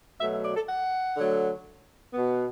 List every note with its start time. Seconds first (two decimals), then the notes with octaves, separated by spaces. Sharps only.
0.20 B2 F#3 A3 E5
0.33 E5
0.45 D5
0.56 A4
0.69 F#5
1.17 D3 F#3 A3
2.13 B2 B3